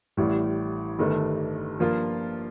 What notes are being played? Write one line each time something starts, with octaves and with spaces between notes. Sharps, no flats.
A1 A2 G3
G1 G2 D#3 A3 D4
G2 F3 A#3 F4